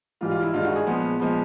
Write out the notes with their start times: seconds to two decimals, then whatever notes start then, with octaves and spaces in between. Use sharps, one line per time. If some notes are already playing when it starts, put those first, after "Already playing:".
0.21 G#2 E3 G3 F4
0.31 F4
0.43 E4
0.53 G2 D#3 G#3 F4
0.64 F#4
0.76 G#4
0.87 A#2 F3 G#3 B3
1.20 A#2 F3 G#3 B3